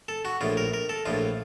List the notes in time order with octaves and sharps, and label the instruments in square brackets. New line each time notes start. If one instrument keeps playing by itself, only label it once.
[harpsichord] A4
F#4
A#1 A2 F4
A#4
A#4
A4
A#1 A2 F4